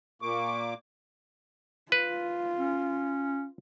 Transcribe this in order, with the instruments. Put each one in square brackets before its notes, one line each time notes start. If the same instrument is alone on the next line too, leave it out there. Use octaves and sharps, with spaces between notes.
[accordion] A#2 A#3 D6 [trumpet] C#6
[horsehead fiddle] F4 [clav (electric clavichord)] B4
[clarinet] C#4